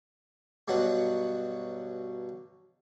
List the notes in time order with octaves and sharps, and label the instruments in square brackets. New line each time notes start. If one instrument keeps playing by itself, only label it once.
[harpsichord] G2 B2 F#3 F#5